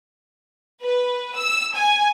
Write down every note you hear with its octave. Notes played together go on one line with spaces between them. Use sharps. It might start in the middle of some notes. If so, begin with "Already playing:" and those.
B4
E6
G#5